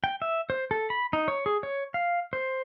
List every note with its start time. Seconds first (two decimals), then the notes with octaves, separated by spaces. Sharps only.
0.04 G5
0.22 E5
0.50 C5
0.71 A4
0.90 B5
1.13 D#4
1.28 C#5
1.46 G#4
1.63 C#5
1.94 F5
2.33 C5